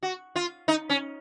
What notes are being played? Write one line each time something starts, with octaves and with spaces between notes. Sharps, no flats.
F#4
F4
D#4
C#4